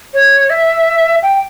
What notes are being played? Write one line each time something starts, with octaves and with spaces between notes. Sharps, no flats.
C#5
E5
G5